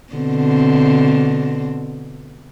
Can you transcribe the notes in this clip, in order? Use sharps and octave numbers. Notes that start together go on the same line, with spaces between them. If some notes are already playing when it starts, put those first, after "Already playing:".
B2 D3 C4